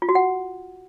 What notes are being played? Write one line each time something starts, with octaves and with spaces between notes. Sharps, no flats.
F4
F#4
F#5